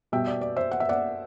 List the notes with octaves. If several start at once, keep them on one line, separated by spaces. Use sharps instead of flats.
B2 G3 B3 E5 G5
D5
D5
C5 E5
F#5
E5
D5 F#5